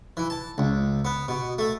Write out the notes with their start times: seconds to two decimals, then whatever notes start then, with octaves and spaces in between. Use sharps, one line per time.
0.17 E3
0.30 A5
0.58 C#2
1.05 B3
1.28 B2
1.59 A3